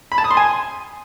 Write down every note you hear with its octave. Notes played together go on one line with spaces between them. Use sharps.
B5
A5
D#6
C6
G#5